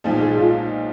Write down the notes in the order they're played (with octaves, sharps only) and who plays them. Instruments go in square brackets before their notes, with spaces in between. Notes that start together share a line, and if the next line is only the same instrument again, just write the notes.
[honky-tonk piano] B1 A#2 F3 G#3 D#4
[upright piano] G#4
F4